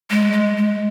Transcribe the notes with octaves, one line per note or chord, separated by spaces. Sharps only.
G#3
G#3
G#3